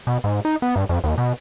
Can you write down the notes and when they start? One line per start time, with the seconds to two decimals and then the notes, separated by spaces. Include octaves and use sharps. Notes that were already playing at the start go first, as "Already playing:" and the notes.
0.07 B2
0.24 G#2
0.45 D#4
0.62 B3
0.76 G2
0.89 F2
1.04 D#2
1.18 B2